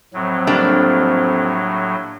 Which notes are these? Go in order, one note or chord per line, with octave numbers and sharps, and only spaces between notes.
F2 A2 F#3 C4
G3 A#3 D4